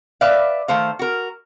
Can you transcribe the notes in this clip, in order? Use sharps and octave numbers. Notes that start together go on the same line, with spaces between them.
B4 D5 E5 F5
D#3 A3 C5 F5
F#4 A#4